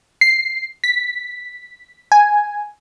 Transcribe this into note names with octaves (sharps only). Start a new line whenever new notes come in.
C7
B6
G#5